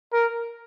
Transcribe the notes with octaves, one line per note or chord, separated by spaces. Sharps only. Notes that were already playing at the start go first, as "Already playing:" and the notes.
A#4